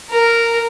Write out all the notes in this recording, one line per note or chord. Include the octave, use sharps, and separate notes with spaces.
A#4